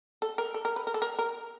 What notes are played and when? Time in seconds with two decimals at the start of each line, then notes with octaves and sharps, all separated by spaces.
0.22 A4
0.38 A#4
0.54 A4
0.65 A#4
0.76 B4
0.87 A#4
0.94 A4
1.02 A#4
1.19 A#4